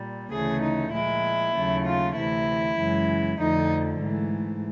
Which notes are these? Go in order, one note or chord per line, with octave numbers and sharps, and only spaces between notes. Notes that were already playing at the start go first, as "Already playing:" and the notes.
Already playing: A#2 G3
D2 C#3 E3 A3 G#4
D#4
A#2 F3 G#3 E4
D#2 C#3 F#3 A3
F4
D2 C3 E3 E4
F#2 C#3 E3 G#3
F2 D3 F3 A3 D#4
G#2 E3 A3